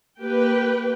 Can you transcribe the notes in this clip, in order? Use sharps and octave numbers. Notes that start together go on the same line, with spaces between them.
A#3 G4 B4 G5